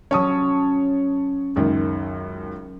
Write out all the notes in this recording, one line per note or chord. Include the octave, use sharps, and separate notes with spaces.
F#3 C#4 C#5 A5 D#6
C#2 F#2 D#3